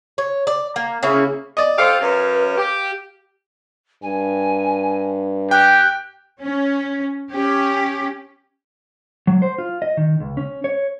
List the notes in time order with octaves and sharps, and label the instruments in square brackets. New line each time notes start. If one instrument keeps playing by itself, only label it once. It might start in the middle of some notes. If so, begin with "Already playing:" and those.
[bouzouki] C#5
D5
A#3
C#3 A#3 C#4 E4
[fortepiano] D5 D#5
[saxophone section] F4 G4 A4 [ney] C5 [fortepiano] F5
[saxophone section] F#2 C#4 [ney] B4
[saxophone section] G4
[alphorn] G2 [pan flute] G#5
[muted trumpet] G4 [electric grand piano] G5 [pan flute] F#6
[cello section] C#4
C#4 G4
[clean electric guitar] F#3
C5
F4
D#5
D#3
C#2
C#4
C#5